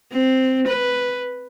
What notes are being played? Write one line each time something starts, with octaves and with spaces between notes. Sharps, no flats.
C4
B4